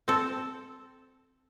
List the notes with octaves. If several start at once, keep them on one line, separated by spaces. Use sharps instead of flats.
C4 A4